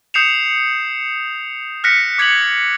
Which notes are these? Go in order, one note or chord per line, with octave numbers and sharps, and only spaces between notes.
D#6 G6 C7 C#7 E7 F7
F6 F#6 A#6 B6 C#7
D6 G#6 B6 C#7 F#7